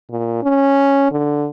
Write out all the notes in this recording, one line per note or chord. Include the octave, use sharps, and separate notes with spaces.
A#2
C#4
D3